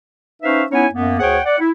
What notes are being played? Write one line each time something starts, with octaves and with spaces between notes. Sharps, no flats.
C#4 D#4 B4 C5 E5 F5
B3 C#4 D#4 E4 C#5 G#5
F#2 A#3 B3
D2 G#4 C5 C#5 F#5 G5
D5 F#5
E4